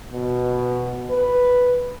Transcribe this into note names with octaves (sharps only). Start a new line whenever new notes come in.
B2
B4